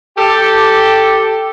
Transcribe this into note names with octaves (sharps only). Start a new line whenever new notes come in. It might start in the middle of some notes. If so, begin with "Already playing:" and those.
G4 A4